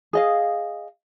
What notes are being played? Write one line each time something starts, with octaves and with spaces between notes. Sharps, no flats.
G#4 D#5 F5